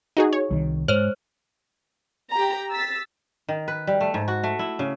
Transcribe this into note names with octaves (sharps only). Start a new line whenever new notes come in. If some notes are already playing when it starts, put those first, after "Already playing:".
D#4 F#4 G#4
C#5
C2 D#3
G#2 C5 C#5 F6
G4 A#5
E6 A6 B6
D#3
B4
G3
A3
G#2
F#4
A3
E4
C#3